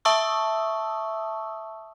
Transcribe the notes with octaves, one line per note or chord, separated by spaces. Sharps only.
E5 A5 C#6 D#6 E6